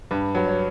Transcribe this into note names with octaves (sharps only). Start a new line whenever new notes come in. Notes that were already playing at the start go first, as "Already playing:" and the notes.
G2 B4
F#3 B4
C#5